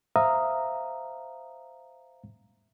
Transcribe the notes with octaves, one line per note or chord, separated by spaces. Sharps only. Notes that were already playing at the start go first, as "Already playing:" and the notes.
C5 E5 F5 A#5 D#6